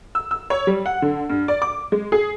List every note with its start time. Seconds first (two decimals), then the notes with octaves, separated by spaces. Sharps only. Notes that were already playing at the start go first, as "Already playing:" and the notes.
0.15 E6
0.31 E6
0.50 C#5
0.67 G3
0.86 F#5
1.02 D3
1.30 G2
1.48 D5
1.62 D6
1.92 G#3
2.12 G#4